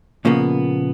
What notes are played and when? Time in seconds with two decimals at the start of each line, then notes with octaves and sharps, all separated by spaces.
0.25 A#2 C#3 F3 A#3 B3